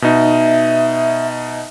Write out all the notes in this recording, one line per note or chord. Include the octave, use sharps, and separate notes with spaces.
B2 D#4 E5